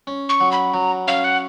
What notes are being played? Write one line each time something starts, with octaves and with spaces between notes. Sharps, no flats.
C#4
C#6
F#3
B5
F#3 A#5
C#4 F5
F#5